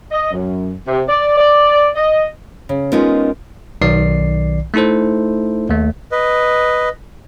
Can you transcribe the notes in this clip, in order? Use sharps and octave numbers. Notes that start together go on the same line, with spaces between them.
D#5
F#2
C3
D5
D5
D#5
C#3
G#3 B3 C#4 D#4 F4 A#4
B1 D#3 D5 C7
A3 D#4 E4 A4 C5
D#2 A3
B4 D#5